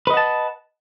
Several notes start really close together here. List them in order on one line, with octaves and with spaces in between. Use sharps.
B4 D#5 F#5 A5